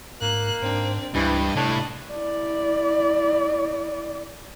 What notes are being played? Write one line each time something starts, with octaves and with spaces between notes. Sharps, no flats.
G#2 A#3 F#6
G#2 C4 D4
C#2 G2 E3 D#5
A2 C3 D4
E4 D5